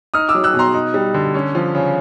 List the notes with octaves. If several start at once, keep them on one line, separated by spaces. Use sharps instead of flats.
D#4 D#6 F6
D6 E6
F#3
E6 F#6
B2
A#5 C6
D#4
G3
D3
C#4
F3
C#3